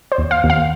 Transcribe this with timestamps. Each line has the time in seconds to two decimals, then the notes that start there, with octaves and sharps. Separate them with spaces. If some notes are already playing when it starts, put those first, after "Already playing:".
0.12 C5
0.18 D#2
0.31 F5
0.44 D#2
0.50 F5